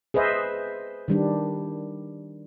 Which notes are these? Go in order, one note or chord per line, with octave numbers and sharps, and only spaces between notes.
G#4 B4 C5 D#5 E5
D#3 G3 D4